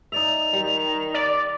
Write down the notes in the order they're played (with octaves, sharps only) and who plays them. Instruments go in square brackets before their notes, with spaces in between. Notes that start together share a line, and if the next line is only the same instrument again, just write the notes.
[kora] D#4 D5 E5 [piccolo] F7
[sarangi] D#3 [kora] G3
[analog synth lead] D5